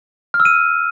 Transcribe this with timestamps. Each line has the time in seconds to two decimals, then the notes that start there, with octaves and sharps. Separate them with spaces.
0.34 F6
0.40 E6
0.45 D#7